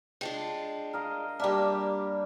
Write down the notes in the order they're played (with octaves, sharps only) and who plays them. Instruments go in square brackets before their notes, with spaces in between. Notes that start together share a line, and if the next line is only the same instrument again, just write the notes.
[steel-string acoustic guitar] G#3 D4 F4 [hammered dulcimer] G5
[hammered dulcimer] A#4 D#5 F5
[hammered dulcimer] G3 A#3 D4 [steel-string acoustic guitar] G4 E5